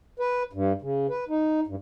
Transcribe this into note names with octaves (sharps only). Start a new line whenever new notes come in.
B4
G2
C#3
B4
D#4
G2